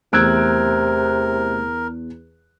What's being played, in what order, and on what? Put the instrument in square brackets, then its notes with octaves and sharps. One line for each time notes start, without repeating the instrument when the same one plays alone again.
[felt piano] E2 F#6 D7 [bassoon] C3 [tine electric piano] A3 E6 G#6 [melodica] A#4